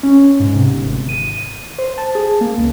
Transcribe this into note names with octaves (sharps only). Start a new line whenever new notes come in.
C#4
G#2
C3
G1
G#1
D#7
C5
A5
G#4
A#3
C#2